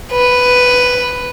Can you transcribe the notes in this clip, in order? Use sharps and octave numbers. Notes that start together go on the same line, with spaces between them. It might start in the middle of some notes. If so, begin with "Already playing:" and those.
B4